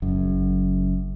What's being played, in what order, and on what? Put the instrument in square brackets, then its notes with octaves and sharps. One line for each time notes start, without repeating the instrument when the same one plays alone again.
[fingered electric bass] F#1 F#2